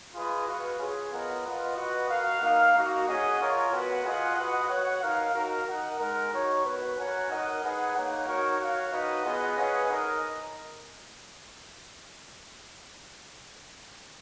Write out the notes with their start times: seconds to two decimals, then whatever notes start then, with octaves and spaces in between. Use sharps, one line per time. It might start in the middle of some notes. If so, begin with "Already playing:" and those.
0.14 F4 G#4 B4 D#5
0.47 F#4 B4 F5
0.79 C#4 F4 G#4
1.12 B3 F4 A#4 D#5 F#5
1.44 F4 B4 D#5 F#5
1.77 F#4 B4 D#5 F#5
2.09 F#4 A#4 F5
2.42 A#3 D#4 A#4 F5
2.74 A#3 D#4 F#4
3.06 C#4 G#4 D#5 F#5
3.39 C#4 F4 A#4 C#5
3.72 B3 F#4 B4 F#5
4.04 F4 G#4 D#5 F#5
4.37 F#4 B4 D#5 F#5
4.69 F#4 C#5 F#5
5.02 D#4 A#4 F5
5.34 D#4 F#4 A#4
5.66 D#4 A#4 D#5 F#5
5.99 G#3 D#4 A#4
6.31 D#4 F#4 C#5
6.64 B3 F#4 B4
6.97 C#4 F#4 A#4 C#5 F#5
7.29 D#4 A#4 D#5 F#5
7.62 D#4 G#4 B4 F#5
7.94 A#3 D#4 A#4 C#5 F#5
8.27 D#4 F#4 A#4 C#5
8.59 F#4 C#5 F5
8.92 D#4 F#4 B4 D#5 F#5
9.24 B3 F4 G#4 D#5 F#5
9.57 C#4 G#4 B4 D#5 F#5
9.90 D#4 A#4 D#5